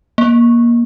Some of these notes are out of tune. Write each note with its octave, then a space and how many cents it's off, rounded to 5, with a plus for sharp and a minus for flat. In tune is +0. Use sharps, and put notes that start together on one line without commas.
A#3 +20